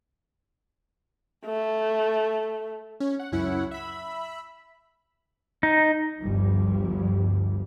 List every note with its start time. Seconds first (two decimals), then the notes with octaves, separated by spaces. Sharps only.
1.46 A3
3.00 C#4
3.19 F#5
3.32 C#2 F#2 C#4 E4 F#5
3.71 E5 B5
5.63 D#4
6.20 G1 D2 G2 F3 G3